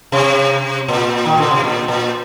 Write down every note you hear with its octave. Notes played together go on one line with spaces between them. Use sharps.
C3
A#2
D#3
D3
C3
A#2
A#2